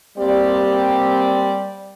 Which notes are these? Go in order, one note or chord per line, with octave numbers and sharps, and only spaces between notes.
G3 A#3 C4 G4 D5